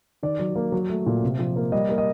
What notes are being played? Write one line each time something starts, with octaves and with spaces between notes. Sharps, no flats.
D#3 D5
F#3
A#3
F#3
A3
A#2
C3
F3
A#3
G3 D#5
A#3
D#5